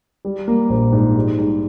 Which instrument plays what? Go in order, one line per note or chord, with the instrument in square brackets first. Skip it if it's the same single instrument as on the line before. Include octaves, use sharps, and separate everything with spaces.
[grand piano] G3
A#3
A#1
G#2
G3
G#2